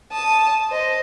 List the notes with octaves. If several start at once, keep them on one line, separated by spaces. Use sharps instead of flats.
A5 D#6
C5 D#5